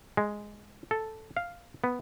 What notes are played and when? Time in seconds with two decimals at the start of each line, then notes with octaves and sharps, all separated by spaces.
0.17 G#3
0.91 A4
1.37 F5
1.84 B3